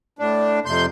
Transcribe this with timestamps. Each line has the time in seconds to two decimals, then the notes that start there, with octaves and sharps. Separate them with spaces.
0.19 A2 D4
0.66 F2 C3 C6 G6